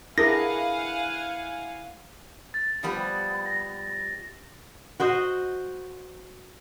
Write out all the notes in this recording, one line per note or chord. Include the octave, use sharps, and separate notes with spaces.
D4 E4 G#4 A#4 F5 F#5 G#5 A#6
A6
F3 G3 B3
A#6
F#4 C5 D#5